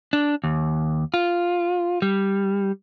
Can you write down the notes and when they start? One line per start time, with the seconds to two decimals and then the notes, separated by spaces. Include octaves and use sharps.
0.13 D4
0.44 D#2
1.14 F4
2.02 G3